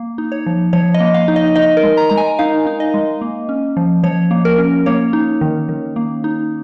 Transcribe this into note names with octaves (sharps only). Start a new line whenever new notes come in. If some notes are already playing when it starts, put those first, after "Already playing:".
Already playing: A#3
D#4
C#5
F3
F3 C#5
D#5
A#3
F5
D#4
D#5
D#4 D#5
A#4
G#3
A#5
G#3 A#5
G#5
D#4 F5
D#4
D#5
G#3
A#3
C#4
F3
F3 C#5
A#3
A#4
C#4
A#3 C#5
D#4
D#3
D#3
A#3
D#4